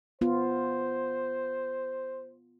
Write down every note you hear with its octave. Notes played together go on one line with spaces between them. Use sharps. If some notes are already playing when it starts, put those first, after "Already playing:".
B3 F4 C5